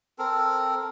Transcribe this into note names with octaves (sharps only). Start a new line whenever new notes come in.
C4 A4 A#4